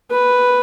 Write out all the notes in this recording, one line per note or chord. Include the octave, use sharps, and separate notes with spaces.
B4